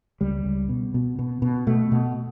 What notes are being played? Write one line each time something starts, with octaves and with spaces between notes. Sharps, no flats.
C#2 G3
C#2
B2
B2
B2
B2
B2 A3
B2